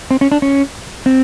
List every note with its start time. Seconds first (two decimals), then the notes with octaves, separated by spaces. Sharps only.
0.11 C4
0.21 C#4
0.32 D4
0.42 C#4
1.06 C4